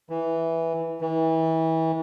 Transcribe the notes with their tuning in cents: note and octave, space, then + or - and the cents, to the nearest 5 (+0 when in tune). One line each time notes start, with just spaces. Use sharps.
E3 -5
E3 -30